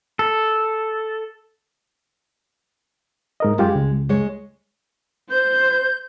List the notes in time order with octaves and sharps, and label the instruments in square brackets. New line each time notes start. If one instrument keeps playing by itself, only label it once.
[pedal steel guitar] A4
[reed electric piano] G#2 A#4 D#5
[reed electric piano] F#2 F4 G4 [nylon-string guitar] G#3
[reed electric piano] C#2
[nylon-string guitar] G#3 C#5
[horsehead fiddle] C5 [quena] G6